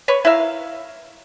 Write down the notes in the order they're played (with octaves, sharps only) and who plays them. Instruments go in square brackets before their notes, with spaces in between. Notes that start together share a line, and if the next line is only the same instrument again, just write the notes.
[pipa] B4 C#5
E4 A#4 E5 F5